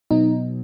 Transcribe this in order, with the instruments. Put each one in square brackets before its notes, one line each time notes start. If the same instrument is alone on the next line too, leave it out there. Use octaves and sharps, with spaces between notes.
[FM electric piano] B2 F#3 B3 D#4